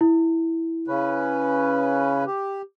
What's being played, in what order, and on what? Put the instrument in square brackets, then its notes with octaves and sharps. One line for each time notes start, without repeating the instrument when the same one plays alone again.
[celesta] E4
[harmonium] C#3 C#4 B4
G4